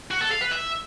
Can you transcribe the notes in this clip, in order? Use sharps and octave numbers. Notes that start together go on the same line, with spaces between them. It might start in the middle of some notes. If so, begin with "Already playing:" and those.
F#4
A4
F5
B4
E5